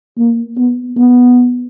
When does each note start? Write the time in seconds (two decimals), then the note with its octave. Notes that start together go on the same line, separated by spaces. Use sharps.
0.18 A#3
0.57 B3
0.97 B3